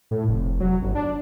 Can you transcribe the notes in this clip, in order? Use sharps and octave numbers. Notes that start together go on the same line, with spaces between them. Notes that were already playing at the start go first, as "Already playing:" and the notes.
A2
F1
F#3
G1
D4